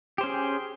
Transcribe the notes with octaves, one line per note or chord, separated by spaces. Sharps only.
C#4 G4 G#4 C5